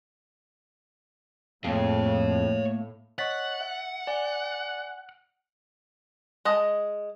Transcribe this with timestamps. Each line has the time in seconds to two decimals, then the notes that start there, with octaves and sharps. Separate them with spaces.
1.64 F2 A2 A3 A#3 C#5 F5
3.19 C#5 D#5 F#5 C#6 A6 B6
3.61 E5
4.07 D5 G#5
6.45 G#3 D#5 A5